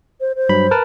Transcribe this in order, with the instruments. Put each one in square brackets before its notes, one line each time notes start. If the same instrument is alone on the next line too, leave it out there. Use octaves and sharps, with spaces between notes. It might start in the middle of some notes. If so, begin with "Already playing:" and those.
[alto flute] C5
C5
[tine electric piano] G2 F#3 B5
A#4 B4 A5